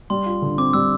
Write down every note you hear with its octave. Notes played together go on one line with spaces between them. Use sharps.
G3 C6
F4
D3
C4 D6
G3 E6